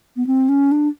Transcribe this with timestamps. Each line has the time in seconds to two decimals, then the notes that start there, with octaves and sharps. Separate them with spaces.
0.16 B3
0.27 C4
0.49 C#4
0.72 D4